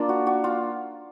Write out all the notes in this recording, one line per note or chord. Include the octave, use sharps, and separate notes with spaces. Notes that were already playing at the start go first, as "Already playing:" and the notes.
Already playing: A#3 D4 F4
F#4
F#4
F4